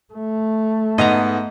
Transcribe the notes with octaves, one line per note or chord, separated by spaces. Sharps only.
A3
G#2 B3 D#5 A#5